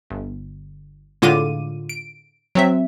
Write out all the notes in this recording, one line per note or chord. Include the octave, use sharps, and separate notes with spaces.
G1
A2 D3 G#3 F4 D6 D#7
D7
F#3 C4 E5